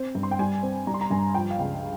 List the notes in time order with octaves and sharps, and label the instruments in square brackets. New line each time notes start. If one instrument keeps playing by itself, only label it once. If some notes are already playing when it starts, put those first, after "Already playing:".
Already playing: [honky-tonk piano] C4
G2
C6
G5
G3 G#5
C4
G3 A#5
C6
A#5
G2 G#5
F3 G5
F5
C#2 G5